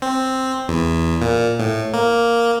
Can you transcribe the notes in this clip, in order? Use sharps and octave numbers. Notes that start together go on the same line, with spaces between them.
C4
E2
A#2
A2
A#3